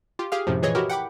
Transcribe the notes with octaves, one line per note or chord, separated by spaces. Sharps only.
F4 G4
G4 G#4 F5 F6
F#2 A2 C3 F3
A#2 E3 G#4 C#5 D#5
E4 F#4 G4 A#4
F#5 G5 B5 D6